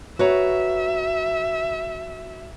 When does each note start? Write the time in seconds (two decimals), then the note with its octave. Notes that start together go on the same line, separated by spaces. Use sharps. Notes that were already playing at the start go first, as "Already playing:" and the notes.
0.19 F#4 B4 C#5 E5 A#5